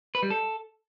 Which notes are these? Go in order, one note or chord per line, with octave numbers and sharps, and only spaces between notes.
B4
G3
A4